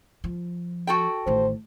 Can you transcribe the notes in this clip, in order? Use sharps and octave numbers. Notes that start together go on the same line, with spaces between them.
F3
F#4 A4 G5
A1 D#3 C5